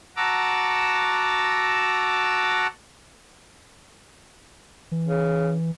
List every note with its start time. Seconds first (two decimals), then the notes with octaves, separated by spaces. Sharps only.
0.16 F#4 F#5 A5 A#5 D6 E6
4.92 E3
5.07 C#3